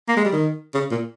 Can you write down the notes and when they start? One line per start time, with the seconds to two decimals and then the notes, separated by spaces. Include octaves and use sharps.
0.08 A#3
0.17 G#3
0.25 G3
0.33 D#3
0.74 C#3
0.91 A#2